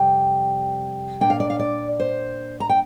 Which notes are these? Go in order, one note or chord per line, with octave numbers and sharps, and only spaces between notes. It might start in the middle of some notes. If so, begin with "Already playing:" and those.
Already playing: F2 C3 G3 G5
A#2 A#3 D4 G5
F5
D5
F5
D5
C5
A#5
G5